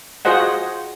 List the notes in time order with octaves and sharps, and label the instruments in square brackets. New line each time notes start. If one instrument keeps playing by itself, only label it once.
[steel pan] F4 F#4 G#4 C5 D#5 F#5